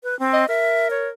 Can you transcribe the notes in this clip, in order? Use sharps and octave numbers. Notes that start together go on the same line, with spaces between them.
B4
C4
D#5
A#4 E5
C#5